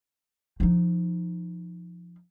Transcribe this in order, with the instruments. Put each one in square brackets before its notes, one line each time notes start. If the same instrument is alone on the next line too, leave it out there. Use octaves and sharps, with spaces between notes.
[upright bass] F3 D#4